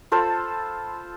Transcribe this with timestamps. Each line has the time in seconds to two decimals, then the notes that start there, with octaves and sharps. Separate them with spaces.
0.12 F4 A4 C5 B5